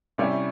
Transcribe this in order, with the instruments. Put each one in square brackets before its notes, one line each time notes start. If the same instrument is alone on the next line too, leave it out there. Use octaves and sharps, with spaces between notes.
[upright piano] C3 G3 C#4 E4